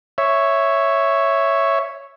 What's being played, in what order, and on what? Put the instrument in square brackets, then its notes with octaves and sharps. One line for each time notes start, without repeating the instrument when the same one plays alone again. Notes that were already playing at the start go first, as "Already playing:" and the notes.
[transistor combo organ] C#5 E5